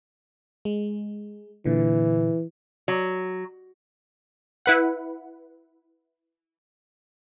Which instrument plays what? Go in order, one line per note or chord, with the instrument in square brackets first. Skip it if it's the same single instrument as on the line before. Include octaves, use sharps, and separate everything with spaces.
[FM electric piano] G#3
[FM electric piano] A#2 D3 [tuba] E3
[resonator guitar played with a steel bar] F#3
[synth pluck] E4 B4 F#5